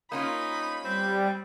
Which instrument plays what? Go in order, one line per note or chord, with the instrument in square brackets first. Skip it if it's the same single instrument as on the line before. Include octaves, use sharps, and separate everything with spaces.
[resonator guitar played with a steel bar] A#3 C#4 F4 [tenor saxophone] D#4 [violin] B5
[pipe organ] G3 [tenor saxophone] C4